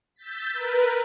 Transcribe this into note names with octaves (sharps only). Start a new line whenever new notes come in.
E6 G6 A6 B6
A#4 B4